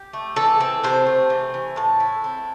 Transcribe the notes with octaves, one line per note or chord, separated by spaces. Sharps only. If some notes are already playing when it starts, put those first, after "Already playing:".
Already playing: G4
A3
E3 A4
C4
C3 C5
A3
E3
E3
A2 A5
E4
C4